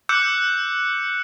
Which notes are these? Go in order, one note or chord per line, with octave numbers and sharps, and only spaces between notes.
D6 E6 F#6 G6 C#7